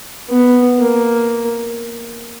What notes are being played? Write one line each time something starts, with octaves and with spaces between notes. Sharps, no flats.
B3
A#3